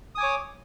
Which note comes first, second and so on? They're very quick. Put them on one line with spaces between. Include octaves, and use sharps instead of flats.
D#6 G#5 D6 C#5